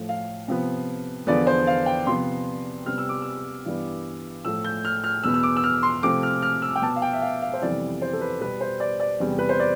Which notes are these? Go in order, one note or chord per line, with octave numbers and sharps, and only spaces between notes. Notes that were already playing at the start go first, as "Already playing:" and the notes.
Already playing: A2 F3 A3
F5
C3 F3 B3
E2 D3 F3 B3 D5
C5
F5
G5
C3 F3 B3 C6
C3 G3 B3 F6
E6
D6
E6
G2 E3 G3 B3
A2 F3 A3 E6
G6
F6
F6
E2 B2 B3 E6
E6
D6
E6
F6
C6
C3 F3 A3 D6
F6
F6
E6
G5
B2 B3 A5
F5
G5
E5
F5
F5
C5
F2 C3 E3 G3 B3 D5
C5
A4
B4
B2 G3 B3 B4
C5
D5
D5
E2 C3 G3 B3
B4
C5
D5